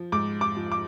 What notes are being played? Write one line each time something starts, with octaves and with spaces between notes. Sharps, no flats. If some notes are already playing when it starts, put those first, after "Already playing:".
Already playing: F3
G#2 D6
D6
F3
D6